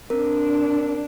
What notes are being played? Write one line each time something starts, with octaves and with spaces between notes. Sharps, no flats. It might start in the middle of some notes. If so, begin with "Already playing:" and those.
C4 D4 A#4